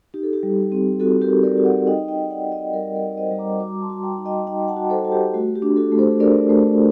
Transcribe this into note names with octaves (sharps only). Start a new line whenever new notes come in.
D#4 G4
A4
G4
G3
C4
C4 F#4 A4
G4 A#4
D#4
A#4 D5
F#4
D5 F#5
D#4 D#5 G5
D#5 G5
D#4
D5 F#5
D#4
D#5 G5
G3 A#4 D5
A#4 D5
D#4
C5 D#5
G3
A#5 D6
F#4 A#5 D6
A5 C6
F#4
G5 A#5
D#4
D#5 G5
D#4 D#5 G5
F#5 A5
F#4
A4 C5
F#4
G4
A3 F#4
G4
D4
F#4 A4
A3
A4 C5
D4 A#4 D5
A3